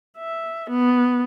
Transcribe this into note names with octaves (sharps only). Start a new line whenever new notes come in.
E5
B3